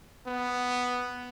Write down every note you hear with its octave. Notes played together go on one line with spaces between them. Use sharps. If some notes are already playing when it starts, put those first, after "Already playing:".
B3